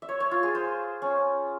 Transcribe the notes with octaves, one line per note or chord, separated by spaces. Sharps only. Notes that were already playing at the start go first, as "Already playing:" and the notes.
E5
C#5
C#5
F4
G#4
C5
C#4